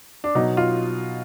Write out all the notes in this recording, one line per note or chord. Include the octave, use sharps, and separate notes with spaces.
D4
B2 F#3 D#4
F4